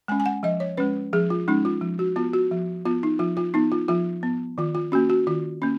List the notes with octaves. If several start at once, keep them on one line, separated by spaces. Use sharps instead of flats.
G#3 C#4 G#5
G#5
F#5
F3 D#5
C#5
G#3 C#4 B4
F3 G#4
F4
G#3 C#4 D#4
F4
F3
F#4
B3 F4
F#4
F3
B3 F4
D#4
F3 F4
F4
B3 D#4
F4
F3 F4
B3
D#3 F4
F4
A#3 C#4 F#4
F#4
D#3 F4
A#3 C#4